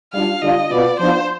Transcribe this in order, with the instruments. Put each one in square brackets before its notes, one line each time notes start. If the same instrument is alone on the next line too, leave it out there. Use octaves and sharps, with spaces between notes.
[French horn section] G3 D4 F4 [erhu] F5
[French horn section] D3 G3 D4 F4 [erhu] D#5
[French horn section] B2 B3 F4 [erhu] D5
[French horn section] F3 B3 D4 F4 [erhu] C5